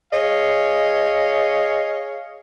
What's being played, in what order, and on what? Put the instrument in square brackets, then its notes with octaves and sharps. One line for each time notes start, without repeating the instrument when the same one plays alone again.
[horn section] G#4 C#5 D#5 F5